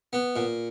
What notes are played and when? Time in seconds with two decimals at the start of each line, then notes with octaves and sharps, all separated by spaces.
0.13 B3
0.36 A#2